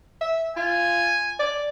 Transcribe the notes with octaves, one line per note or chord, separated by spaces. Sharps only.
E5
F4 G#5
D5